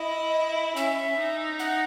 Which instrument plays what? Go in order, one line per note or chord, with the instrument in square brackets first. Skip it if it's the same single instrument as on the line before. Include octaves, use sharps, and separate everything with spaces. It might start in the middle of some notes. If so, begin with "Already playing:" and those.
Already playing: [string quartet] E4 [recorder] D#5
[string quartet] C#4 [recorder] E5
[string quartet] D#4
[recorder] F#5